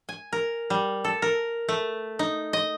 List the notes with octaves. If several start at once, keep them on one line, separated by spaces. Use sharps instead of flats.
G#5
A#4
G3
A4
A#4
A3
D#4
D#5